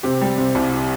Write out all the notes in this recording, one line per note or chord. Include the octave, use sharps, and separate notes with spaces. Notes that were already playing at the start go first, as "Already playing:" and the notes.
C3 G4
G3
C3
C2